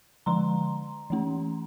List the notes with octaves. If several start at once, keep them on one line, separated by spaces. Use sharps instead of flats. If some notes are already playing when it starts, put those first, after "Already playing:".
D3 F3 G#3 A#5 C6
E3 A3 C#4